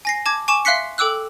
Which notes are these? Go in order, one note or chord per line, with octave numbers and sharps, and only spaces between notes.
G#5 A#6 C7
A5 D6 G#6
G#5 C#6 D6 E7
E5 F5 C6 F#6 B6 C#7
A4 G5 D6 E6 F#6